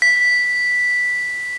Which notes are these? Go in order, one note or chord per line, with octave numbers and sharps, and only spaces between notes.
B6